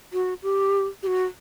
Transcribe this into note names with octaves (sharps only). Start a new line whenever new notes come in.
F#4
G4
G4
F#4